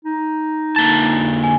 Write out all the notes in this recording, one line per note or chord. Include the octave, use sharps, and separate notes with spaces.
D#4
D3 A#3 A5 A6
G#5